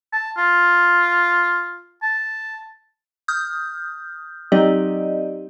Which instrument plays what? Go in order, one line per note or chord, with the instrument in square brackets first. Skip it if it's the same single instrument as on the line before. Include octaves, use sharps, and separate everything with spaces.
[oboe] A5
F4
A5
[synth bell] D#6 F6 G6
F#3 C4 D#4 G4 D5 D#5